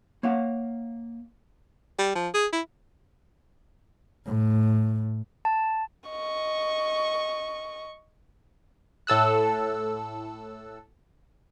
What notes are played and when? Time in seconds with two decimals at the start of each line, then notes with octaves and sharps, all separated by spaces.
0.23 A#3 C#5 F5 F#5
1.99 G3
2.15 F3
2.34 G#4
2.53 E4
4.26 A2
5.45 A5
6.10 D#5 C#6
9.07 A2 A4 E6 F#6